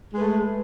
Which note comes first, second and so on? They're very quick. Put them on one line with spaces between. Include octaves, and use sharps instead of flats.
G#3 B4 A3